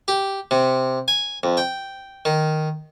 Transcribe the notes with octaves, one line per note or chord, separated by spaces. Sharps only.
G4
C3
G#5
F2
G5
D#3